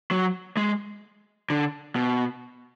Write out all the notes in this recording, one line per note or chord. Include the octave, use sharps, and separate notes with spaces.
F#3
G#3
D3
B2